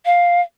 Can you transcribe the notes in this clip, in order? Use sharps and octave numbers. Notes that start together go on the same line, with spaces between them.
F5